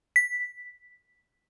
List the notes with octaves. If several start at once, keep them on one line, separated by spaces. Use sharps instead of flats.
B6